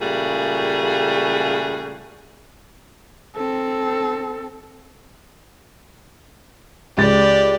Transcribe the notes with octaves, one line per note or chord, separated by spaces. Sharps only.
A#2 C#3 G3 A3 F#4 G#4
C4 A4
C#2 G4 D5 A6